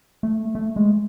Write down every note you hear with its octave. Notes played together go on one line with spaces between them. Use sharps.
A3
A3
G#3